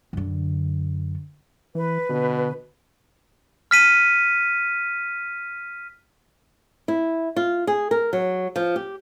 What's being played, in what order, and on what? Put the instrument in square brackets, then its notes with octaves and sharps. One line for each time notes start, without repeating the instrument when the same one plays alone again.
[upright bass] F#2 D3
[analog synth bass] E3 [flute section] B4
[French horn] B2 [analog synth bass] D3
[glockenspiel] F6 B6 D#7
[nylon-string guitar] E4
F4
G#4
A#4
F#3
F3
G4